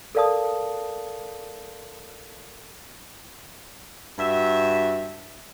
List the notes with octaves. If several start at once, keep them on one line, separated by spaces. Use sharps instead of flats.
A4 A#4 D5 F5 A5 D#6
G2 F#4 E5